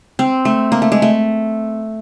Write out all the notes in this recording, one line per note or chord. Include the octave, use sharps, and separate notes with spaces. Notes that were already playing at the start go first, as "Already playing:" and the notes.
C4
A3
A#3
A3
G#3
A3